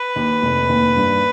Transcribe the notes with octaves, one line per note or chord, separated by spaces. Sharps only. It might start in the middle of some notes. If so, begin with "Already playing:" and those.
Already playing: B4
D#2
F1
D#2
G2